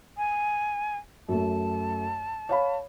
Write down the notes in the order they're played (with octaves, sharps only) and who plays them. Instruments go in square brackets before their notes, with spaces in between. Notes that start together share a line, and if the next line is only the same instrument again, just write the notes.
[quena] G#5
[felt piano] F#2 A3 [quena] A5
[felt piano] C#5 F5 B5